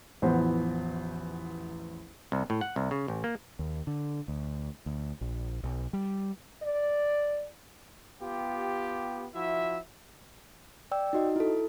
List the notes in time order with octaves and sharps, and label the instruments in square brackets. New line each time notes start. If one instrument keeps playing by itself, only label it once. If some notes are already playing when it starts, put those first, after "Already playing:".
[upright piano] A1 E2 F3 B3 C5
[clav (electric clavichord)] C2
A2
F#5
C2
C#3
A1
A#3
[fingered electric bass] D#2
D3
D2
D2
A#1
B1
G3
[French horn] D5
[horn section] B3 F4 G4
F3 E4 F#4 E5
[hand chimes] D5 G5 E6
D#4 F#4 D#5
E4 A4